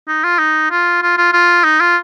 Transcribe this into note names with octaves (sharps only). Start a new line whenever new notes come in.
D#4
F4
D#4
F4
F4
F4
F4
D#4
F4